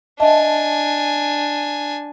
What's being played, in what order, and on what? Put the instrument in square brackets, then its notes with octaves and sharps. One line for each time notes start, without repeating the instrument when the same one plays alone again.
[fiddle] D4 G#5 [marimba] D#5 E5 A5